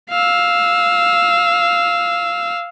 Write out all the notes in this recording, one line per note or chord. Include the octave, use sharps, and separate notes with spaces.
F5 E6